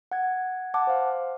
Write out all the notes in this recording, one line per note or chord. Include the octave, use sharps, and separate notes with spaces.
F#5 G#6
F#5 A5 D6
C5 F5